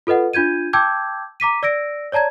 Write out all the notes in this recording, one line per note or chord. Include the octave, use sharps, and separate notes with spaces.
F4 A4 B4 D#5 F#5
D4 F4 G6 G#6 D#7
G5 A5 D6 E6 G6 G#6
A#5 D6 B6 D#7
D5 E6 A#6 D7
C#5 D5 A5 A#5 G#6